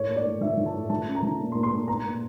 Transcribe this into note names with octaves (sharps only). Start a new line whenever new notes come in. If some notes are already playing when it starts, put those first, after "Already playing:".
Already playing: A2 C#5
A#3
D5
A2
F3 E5
F3
A5
A2
F3 A5
C#4
A#5
F3
A#2
C6
A#2
C6
A#2
B3 A#5
A#2